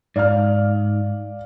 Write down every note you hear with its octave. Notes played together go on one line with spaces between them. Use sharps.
G#2 D5 F5 F6